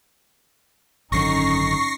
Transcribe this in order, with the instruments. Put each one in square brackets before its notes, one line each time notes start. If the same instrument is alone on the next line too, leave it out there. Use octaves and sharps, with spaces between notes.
[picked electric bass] G#1 F#2 D3 [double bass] C#4 D#4 [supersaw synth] C#6 A#6 C7